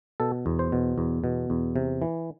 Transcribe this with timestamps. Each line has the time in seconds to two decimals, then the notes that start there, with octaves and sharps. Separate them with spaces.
0.20 B2 A4
0.46 E2
0.59 C5
0.72 B2
0.98 E2
1.24 B2
1.50 E2
1.76 C3
2.02 E3